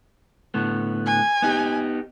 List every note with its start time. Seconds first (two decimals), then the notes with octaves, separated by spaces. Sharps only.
0.54 A2 D3 B3
1.06 G#5
1.42 B3 D#4 G4